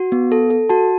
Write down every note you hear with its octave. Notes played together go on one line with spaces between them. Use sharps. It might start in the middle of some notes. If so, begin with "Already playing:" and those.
Already playing: F#4
B3
A4
A4
F#4 A5